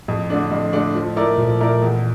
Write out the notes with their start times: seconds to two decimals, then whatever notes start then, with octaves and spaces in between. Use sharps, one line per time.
0.08 F2 A2
0.30 D3 A3 D4
0.51 F2
0.73 D3 A3 D4
0.94 F3
1.16 A3 E4 A#4 D5
1.38 A#2 F3
1.60 A3 E4 A#4 D5
1.82 E2